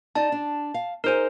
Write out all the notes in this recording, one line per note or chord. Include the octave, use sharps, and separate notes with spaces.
D#4 D5 A5
D4
F5
D#4 G#4 A#4 C5 G#5